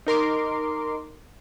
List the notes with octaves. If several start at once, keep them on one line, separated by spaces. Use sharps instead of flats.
D#4 A#4 C6 D6